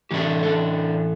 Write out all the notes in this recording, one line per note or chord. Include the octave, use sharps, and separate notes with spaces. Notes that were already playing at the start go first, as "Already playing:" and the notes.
A2 E3 A3 D4 G4
A4